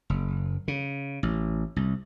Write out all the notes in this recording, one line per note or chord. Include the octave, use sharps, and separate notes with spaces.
F#1
C#3
A1
C2